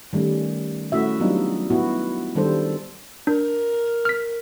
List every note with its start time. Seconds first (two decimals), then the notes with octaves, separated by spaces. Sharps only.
0.13 D#3 G3 A3 C#4
0.92 A3 C#4 E4 F#4 E5
1.20 F#3 G3 B3 D4 D#4 F4
1.70 B3 E4 F#4
2.35 D#3 G3 D4 A4 C5
3.27 D4 A#4
4.05 F6 B6